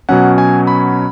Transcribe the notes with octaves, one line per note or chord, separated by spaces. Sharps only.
B2 F#3 C#4 F#5
G#5
B5